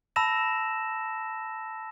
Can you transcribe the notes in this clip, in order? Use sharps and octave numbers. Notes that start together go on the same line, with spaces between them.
A5 B5 E6 A#6 E7